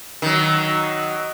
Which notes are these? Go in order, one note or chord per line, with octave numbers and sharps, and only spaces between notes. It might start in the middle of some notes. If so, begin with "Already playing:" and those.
D#3 F#3